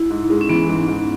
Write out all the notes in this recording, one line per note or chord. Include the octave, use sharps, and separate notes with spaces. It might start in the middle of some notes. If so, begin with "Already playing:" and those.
Already playing: E4
G#2
G#3
C#4
E3 B3
G#2
G#2